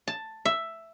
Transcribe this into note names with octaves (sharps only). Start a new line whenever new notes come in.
A5
E5